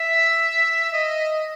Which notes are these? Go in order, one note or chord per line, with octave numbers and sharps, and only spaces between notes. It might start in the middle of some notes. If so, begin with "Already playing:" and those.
Already playing: E5
D#5